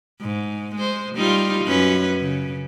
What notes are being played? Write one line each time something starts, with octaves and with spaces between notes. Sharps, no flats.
G#2
G#3 C5
G3 D#4 F4
F#2 C#4 B4
C#3